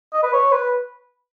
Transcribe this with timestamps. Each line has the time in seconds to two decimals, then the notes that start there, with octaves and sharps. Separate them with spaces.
0.13 D#5
0.23 B4
0.33 C#5
0.52 B4